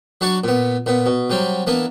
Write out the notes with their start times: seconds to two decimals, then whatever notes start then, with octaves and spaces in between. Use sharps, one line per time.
0.21 F#3 D4 F#4 D5 C#6
0.44 A#2 B3
0.86 A#2 B3
1.06 B2
1.30 C3 F#3 G3 C4
1.67 E3 A#3 B3 D4